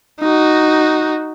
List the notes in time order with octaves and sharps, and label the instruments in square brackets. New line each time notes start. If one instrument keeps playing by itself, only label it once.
[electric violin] D#4 F#4